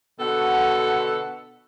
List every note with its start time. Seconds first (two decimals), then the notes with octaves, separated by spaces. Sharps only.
0.19 B2 D3 F#4 A4 F#5